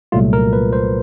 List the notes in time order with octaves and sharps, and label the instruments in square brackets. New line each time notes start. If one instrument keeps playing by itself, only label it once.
[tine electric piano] C2 A#2 F#3 A3 F4
A#4
B4
C5